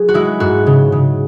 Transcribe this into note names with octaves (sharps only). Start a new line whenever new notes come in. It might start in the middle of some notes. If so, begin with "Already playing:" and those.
Already playing: F#3 G#4
F#4
G#3 E4
G#2 F#4
C#3
C#3